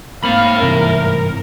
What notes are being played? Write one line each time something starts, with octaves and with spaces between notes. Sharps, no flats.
G#2 A3 A#3 C4 F5 B5
G2 C3 E3 A#4